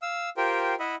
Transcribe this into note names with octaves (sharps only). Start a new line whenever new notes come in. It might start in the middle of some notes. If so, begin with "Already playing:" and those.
F5 E6
F4 G4 A#4 C5 G5
E4 D#5 E5 F#5 B5